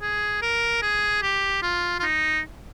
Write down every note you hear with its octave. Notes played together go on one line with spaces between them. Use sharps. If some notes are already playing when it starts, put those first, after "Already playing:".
G#4
A#4
G#4
G4
F4
F4
D#4